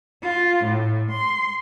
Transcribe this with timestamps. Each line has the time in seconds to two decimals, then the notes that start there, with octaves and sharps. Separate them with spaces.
0.23 F4
0.65 A2
1.11 C6